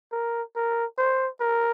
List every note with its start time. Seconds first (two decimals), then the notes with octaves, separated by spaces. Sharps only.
0.12 A#4
0.56 A#4
0.98 C5
1.40 A#4